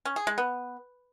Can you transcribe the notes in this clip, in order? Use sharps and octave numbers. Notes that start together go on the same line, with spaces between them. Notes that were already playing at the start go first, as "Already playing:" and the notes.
C#4
G#4
G#3
B3